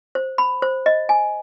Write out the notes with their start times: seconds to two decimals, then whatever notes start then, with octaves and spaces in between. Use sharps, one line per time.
0.15 C5
0.38 B5
0.62 C5
0.86 D#5
1.09 G#5